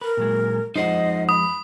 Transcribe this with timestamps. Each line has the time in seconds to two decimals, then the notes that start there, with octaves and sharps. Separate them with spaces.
0.01 A#4 B4
0.17 A#2 F#3 G#3
0.76 F2 F3 G#3 D#4 C5 D#5 F#5
1.29 B5 D#6